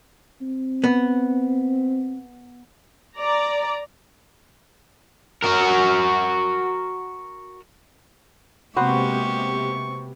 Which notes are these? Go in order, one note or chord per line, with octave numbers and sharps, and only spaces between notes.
C4
B3
D5 A#5
F#4 A#4
C3 G#3 A#3 B3 F#4 G4 C5 C#6